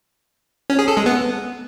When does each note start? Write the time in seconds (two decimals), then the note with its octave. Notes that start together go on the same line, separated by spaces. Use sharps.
0.70 C#4
0.79 G#4
0.88 A4
0.97 G#3
1.06 B3